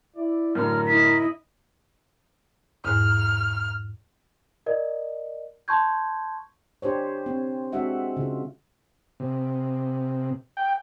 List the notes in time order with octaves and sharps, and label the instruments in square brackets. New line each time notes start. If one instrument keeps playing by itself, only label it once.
[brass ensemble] E4 D5
[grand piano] F#2 A2 D3 [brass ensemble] A#4 [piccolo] F6
[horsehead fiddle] E4 D#5 [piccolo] B6
[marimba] E2 G#2 F#6 [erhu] F6
[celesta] A#4 D5 D#5
A5 C6 C#6 G6 G#6
[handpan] D4 G4 C5 C#5
C4
G#3 C4 D4 F#4 E5 F#5
C#3 F4
[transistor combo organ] C3
G5